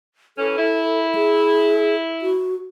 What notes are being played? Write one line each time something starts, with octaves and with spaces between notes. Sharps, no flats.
E3 C#4 A4
E4
G#4
F#4